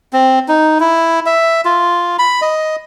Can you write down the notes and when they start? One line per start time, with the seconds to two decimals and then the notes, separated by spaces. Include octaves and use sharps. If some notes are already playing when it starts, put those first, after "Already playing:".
0.13 C4
0.48 D#4
0.80 E4
1.26 E5
1.65 F4
2.19 B5
2.42 D#5